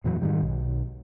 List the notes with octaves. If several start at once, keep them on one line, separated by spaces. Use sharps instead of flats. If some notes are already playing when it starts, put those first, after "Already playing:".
F2 A#2 E3 F#3
G#2 D#3 G3
B1